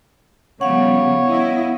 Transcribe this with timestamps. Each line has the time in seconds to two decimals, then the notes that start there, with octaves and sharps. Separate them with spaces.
0.61 C#3 F3 G3 B3 C#5 F5 F#5
1.28 E4 D#5